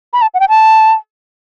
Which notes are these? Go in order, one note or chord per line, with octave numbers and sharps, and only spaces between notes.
B5
A5
F#5
G5
A5